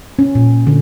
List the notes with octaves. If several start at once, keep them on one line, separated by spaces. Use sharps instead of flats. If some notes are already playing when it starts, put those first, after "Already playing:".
C#4
A#2
D3